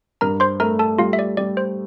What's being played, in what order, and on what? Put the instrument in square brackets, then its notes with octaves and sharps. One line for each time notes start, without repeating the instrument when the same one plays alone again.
[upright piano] G2 [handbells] A#4 A#5
[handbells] C5 C6
[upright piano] A3 [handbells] A#4 A#5
[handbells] A4 A5
[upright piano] G3 [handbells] F4 F5
[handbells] E5
D5
[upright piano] G3 [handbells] D5
[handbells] C5